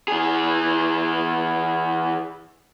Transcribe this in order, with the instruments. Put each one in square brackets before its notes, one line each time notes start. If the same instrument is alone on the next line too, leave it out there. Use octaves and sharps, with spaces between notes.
[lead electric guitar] E3 G#4